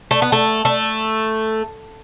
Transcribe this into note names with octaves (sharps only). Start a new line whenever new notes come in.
A3
B3
A3
A3